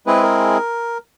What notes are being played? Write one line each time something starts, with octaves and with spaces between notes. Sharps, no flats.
G#3 C4 E4 G#4 B4
A#4